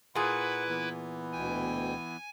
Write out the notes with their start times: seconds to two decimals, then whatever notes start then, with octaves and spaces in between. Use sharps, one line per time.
0.15 A#2 E4 G#4 B4 F#5
0.69 E3 B3
1.33 D2 B2 G5 G#5